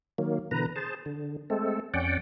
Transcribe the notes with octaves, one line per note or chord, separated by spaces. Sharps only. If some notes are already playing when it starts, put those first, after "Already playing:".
D#3 F#3 A#3
B2 D3 E3 B4 A#5
G#4 C5 A5
D3
G#3 A3 C4 A4
F2 C#4 D5 F#5 G5